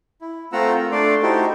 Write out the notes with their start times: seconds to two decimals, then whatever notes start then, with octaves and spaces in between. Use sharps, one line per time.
0.21 E4
0.53 A3 C4 F4 F#5 A#5 E6
0.77 A#4
0.92 A3 D4 D5 C6
1.23 D#4 E4 F#4 G4 A4 C5